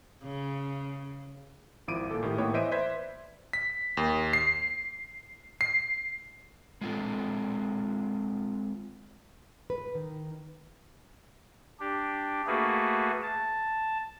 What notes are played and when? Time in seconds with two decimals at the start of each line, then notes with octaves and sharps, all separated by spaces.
0.24 C#3
1.88 G#1 F3 E4 D6 D7 D#7
2.11 A#2 A4
2.23 A2 D#3 G4
2.38 A2 A#3 B3 C#5 G5 D6
2.54 E3 C5 D#5 E5 D7 D#7
2.71 B4 C5 D5 E5 G#6 B6
3.53 B6
3.97 D#2
4.33 C7
5.61 C7
6.81 G#3 C4 F4 A4
9.70 B4
9.95 D#3
11.80 D4 G4
12.47 A3 A#3 F#4 G#4 B4
13.22 A5